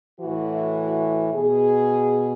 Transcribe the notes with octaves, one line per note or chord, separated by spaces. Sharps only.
A2 E3 F#4
B2 G#4